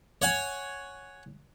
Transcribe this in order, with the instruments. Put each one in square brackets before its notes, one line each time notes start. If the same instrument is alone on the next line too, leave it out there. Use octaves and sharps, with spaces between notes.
[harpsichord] C#5 F#5 G#5